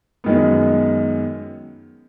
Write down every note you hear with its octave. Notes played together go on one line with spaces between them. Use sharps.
F#2 D#3 G#3 B3